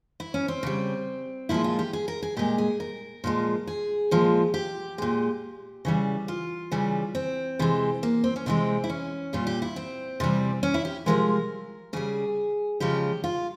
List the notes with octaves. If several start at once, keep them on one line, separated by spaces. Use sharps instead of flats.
E4
C#4
C4
C#3 G3
A#2 F3 G#3 E4
F4
G4
G#4
A#4
G#4
A#2 G#3 G4
G#4
A#4
A#2 F3 G#3
G#4
A#2 F3 G#3
G4
A#2 G#3
C#3 E3 G3
F4
C#3 E3 G3
C4
C3 E3 G#3
A#3
C4
C#4
C3 E3 G#3 C4
E4
C#4
A#2 G3 F4
G4
E4
C4
C3 E3 G3
C#4
E4
G4
C3 F3 G#3 A#4
C#3 G3 G#4
C#3 F3 G#3 G4
F4